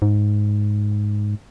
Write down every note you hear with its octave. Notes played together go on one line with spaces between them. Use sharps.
G#2